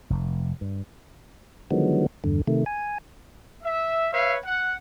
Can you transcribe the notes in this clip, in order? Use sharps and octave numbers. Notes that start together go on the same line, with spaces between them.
F1
G2
D3 D#3 F3 F#3 G#3 B3
E2 G2 D3
C3 D#3 A3
G#5
E5
B4 C#5 E5 F5
F#5